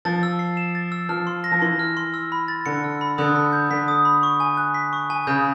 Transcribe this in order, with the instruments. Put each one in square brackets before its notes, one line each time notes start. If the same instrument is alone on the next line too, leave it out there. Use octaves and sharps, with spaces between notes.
[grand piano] F3 [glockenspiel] A6
[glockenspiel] E6
C7
E7
A6
E6
[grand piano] F3 [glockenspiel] F6
[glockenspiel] C6
A#6
[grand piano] F3
[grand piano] E3 [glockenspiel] C6
[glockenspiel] F6
C6
E6
B5
A6
[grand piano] D3 [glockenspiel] C#7
[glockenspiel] E6
B5
[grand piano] D3 [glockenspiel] D#6
[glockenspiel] B5
G6
[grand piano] D3 [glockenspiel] B6
[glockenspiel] D#6
B5
C#6
G#5
F#6
B6
C#6
G#5
[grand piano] C#3 [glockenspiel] G6